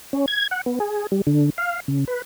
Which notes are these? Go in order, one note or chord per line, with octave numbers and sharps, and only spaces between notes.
C#4
G#6
F#5
B3
G#4
G3
D3
F5
C#3
B4